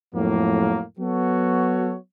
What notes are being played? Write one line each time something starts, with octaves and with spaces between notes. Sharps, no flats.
F2 A2 F#3 A#3
F#3 B3 F#4 A4 C#5